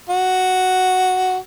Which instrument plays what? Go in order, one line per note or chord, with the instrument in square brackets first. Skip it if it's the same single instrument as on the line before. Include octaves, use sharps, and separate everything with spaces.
[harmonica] F#4